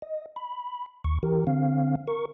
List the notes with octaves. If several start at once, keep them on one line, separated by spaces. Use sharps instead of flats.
D#5
B5
D#2 C#6
E3 G4 A#4
D3 C4 F5
A#4 C#6